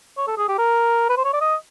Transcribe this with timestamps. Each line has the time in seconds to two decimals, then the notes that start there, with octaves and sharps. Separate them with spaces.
0.17 C#5
0.27 A4
0.37 G#4
0.48 G4
0.58 A#4
1.09 B4
1.17 C5
1.25 C#5
1.33 D5
1.41 D#5